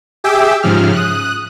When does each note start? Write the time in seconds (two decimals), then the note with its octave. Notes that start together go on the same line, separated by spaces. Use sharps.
0.24 G4 G#4 E5 G5 D6 E6
0.63 G#2 C#3 F3 F6
0.93 D#6 F#6